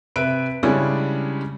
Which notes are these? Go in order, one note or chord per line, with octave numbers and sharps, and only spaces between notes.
C3 B4 E5 D7
C#3 G3 G#3 C#4 D4 E4